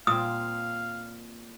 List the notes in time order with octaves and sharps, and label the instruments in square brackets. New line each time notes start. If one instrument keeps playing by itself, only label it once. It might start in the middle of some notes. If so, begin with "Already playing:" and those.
[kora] A#2 C4 [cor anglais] F5 [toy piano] D#6